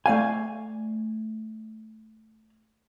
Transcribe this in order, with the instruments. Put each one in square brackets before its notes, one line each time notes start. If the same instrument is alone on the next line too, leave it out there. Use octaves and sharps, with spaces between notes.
[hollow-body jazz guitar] A3 D5 F5 G#5